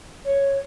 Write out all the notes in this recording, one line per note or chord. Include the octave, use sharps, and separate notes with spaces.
C#5